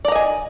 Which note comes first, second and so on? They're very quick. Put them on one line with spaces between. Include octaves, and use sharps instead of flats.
D5 A#5 D#5 G#5